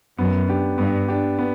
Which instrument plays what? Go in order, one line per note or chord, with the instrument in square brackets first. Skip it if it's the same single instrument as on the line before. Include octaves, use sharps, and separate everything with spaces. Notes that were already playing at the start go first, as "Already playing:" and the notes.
[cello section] F#2 [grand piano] B3
[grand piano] D4 G4
[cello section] G2 [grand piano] B3
[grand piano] D4 G4
B3